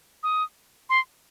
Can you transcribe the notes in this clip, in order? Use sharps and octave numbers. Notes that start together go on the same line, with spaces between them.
D#6
C6